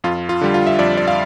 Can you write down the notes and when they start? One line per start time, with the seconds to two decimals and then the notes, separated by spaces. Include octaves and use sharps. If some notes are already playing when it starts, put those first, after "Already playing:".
0.04 F2 F4
0.29 F4
0.41 D3 G3
0.54 F4
0.67 E5
0.79 F2 D5
0.97 D5
1.08 F5